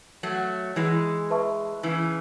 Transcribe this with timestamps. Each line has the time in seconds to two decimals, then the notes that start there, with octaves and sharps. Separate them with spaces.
0.23 F#3 A3
0.76 E3 G#3
1.30 B4 E5 A5 C#6
1.83 C#3 E3